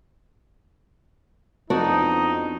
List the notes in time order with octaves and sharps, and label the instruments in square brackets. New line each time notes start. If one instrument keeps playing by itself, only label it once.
[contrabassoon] F2 [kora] B3 D4 F#4 [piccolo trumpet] D#4